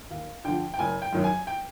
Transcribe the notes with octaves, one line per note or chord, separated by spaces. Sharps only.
D#2 F5
D3 F3 G5
G5
F#1 G#5
G5
F#2 D#3 F#3
G#5
G5